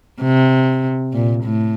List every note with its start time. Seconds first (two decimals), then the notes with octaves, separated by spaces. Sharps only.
0.22 C3
1.13 A#2
1.43 A2